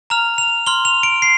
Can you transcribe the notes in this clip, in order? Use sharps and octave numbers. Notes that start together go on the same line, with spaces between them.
A#5 F6 F7
F7
C6 F6 G7
F7
D7
C7